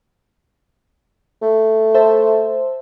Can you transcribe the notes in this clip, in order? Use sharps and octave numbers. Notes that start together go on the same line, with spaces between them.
A3
C5 E5 A5